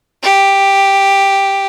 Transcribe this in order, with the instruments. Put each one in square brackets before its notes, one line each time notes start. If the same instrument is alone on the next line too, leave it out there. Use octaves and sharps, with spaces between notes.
[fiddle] G4